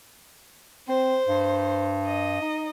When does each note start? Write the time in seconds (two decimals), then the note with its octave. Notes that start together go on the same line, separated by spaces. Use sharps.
0.88 C4 C5
1.28 G2
2.06 D#5
2.42 D#4